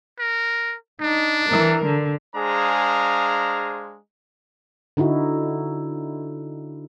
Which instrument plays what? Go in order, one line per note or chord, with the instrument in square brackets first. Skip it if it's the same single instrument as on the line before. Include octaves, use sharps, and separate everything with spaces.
[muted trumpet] A#4
[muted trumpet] D4 [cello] D#4
[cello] E3 A#4
D3
[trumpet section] G#3 D4 G#4 C5 F5 A#5
[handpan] D3 D#4 E4 F#4